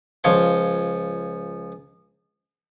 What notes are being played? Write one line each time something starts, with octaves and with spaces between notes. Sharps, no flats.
C#2 F3 C#5 C6